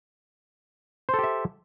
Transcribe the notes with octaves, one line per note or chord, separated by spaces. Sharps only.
G4 A4 C5 E5